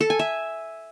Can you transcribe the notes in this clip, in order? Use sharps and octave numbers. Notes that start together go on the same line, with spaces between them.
A4
G#5
E5